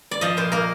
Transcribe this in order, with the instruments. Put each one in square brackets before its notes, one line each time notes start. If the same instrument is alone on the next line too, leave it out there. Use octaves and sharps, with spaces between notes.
[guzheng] D5
F3 D#5
A#2 C5
A#3 A#4